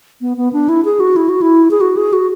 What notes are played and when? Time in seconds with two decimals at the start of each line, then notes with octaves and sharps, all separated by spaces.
0.21 B3
0.37 B3
0.53 D4
0.69 E4
0.85 G#4
1.00 F#4
1.16 E4
1.29 F#4
1.42 E4
1.71 G#4
1.81 F#4
1.96 G#4
2.13 F#4